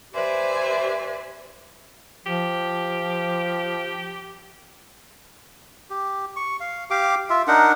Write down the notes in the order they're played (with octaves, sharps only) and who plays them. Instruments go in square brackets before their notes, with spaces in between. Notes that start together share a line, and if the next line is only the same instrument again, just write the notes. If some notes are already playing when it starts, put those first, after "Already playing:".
[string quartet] G4 B4 C5 D5 E5 G#5
[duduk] F3 [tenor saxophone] G4
[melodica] G4
C#6
F5
G4 F5 D6
F4 E5
D4 D#4 A#4 F#5